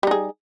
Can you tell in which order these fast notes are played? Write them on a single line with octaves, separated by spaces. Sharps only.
G3 D#4 G#4